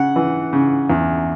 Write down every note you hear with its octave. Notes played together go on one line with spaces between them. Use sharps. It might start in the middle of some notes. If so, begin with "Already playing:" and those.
Already playing: C#3 F#5
E3
C#3
E2